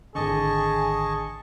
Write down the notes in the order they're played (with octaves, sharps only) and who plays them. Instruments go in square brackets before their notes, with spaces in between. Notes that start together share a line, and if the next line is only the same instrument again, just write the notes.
[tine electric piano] G#1 D3 [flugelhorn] G#4 [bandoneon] D#5 A5 C#6